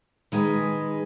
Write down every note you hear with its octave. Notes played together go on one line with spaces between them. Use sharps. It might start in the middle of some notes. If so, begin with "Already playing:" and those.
D#3 G#3 G#4 B4